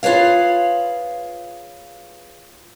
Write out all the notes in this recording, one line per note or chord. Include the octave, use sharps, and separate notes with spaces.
F4 G#4 B4 C#5 F5